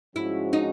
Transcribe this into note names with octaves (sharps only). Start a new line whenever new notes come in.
G#2 F3 G#3 C#4 E4 F#4
D#4